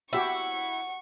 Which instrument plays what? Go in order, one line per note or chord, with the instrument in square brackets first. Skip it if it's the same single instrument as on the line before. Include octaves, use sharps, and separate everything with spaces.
[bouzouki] E4 [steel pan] F#4 G4 E5 [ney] F#5 [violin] C#6